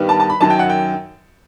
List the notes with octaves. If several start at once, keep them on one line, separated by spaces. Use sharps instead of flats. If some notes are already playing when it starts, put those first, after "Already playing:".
Already playing: G2 D#3 G3 B3
A5
A5
B5
F#2 D#3 F#3 A5
G5
F#5
G5